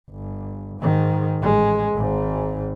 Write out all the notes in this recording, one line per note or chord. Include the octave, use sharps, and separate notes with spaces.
G1
G#2 D#3
A1 G#3
G#1 G#2